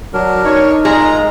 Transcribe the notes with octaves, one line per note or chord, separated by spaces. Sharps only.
F#3 D4 A#4
D#4 C#5
G#3 F4 G#4 A#4 A#5